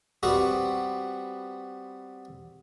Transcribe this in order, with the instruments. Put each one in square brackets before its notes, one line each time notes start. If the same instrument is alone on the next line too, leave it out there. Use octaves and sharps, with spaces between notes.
[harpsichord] G3 B3 C4 F#4